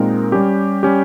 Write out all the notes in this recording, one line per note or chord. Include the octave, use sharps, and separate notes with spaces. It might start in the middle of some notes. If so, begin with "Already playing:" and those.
Already playing: A#2 G#3 C4 D#4 A#4
G3 C#4 G4
G3 C#4 G4